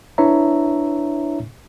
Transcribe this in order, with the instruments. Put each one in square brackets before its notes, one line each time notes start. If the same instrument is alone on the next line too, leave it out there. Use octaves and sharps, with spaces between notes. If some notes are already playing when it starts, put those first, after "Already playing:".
[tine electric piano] D4 E4 B4 C#5 E5 A#5